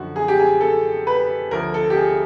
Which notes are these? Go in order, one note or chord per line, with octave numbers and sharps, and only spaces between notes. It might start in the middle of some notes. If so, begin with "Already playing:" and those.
Already playing: F#2 D3 F3 F#4
G#4
G4
G#4
A4
B4
D2 D3 F3 A#4
A4
G4
G#4